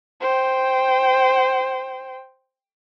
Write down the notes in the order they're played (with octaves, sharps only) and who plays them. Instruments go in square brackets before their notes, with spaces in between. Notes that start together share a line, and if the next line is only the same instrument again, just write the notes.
[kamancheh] C5 G5